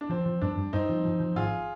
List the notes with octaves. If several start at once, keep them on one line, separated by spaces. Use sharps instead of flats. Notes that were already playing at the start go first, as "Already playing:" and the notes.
D4
F3 C4
F3
G2 D4
G2
G2 C4 D#4
F3
F3
F3
G#1 F4 G#4